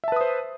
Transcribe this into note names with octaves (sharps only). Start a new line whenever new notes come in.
B4 C5 E5 A5 D#6